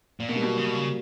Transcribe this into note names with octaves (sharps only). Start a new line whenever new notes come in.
A#2
B2 A#3
G3
F#3 A#3
C#3
B2
C#3